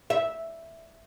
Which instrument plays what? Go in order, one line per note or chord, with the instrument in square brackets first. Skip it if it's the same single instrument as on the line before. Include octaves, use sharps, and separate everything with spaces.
[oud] E5